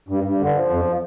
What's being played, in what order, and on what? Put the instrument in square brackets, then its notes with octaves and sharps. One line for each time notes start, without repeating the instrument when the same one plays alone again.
[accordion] G2
G2
D3
F3
F2